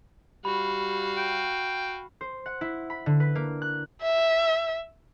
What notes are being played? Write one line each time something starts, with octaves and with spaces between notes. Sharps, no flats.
G3 F#4 F5 B5
G5
C5
F#5
E4
B5
D3
B4
A#3
F#6
E5